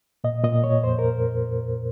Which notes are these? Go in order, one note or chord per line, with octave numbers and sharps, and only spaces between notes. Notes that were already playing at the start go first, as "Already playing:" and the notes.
A#2 D#5
A#2 D#5
A#2 C#5
F2 C5
A#4